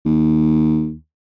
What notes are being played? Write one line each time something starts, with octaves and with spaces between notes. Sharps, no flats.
D#2